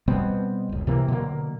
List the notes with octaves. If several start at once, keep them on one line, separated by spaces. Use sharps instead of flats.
B2 G3 B3 C4
F#1 C#2
C3 E3 A#3
B2 D3 F#3 A#3